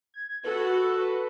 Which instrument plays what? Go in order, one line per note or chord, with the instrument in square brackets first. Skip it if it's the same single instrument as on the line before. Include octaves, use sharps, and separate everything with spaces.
[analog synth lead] G#6
[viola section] F#4 A4 [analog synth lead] B4
[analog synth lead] B4